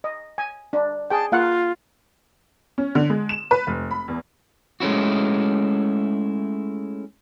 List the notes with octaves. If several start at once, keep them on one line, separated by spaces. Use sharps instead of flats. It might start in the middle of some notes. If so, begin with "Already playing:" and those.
D#5
G#5
D4
G#4 G5 A5
A#3 F4 F5 F#5
C#4
D3
G#3
E7
B4
F1
B5
E2
G#3 A3 C#4 E4 F#4